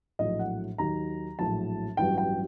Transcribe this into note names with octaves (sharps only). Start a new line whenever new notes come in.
A#1 A2 F#3 D#5
F#5
D#2 D#3 F#3 A#5
A#1 A2 F#3 A5
A1 G2 F#3 G5
G5